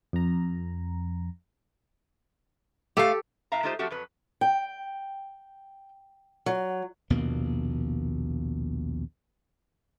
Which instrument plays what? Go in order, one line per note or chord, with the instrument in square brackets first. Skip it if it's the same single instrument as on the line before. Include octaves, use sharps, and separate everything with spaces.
[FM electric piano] F2 A#5
[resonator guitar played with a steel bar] A3 F5 [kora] G4 A4
[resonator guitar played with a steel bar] A2 E5 F5 A#5
G#3 A3 D#4 F4 G4 C5
F3 F#3 A3 C4 F#4 G4
F2 F#3 B4
[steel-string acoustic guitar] G5
F#3
[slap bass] A#1 D#2 B2 A#3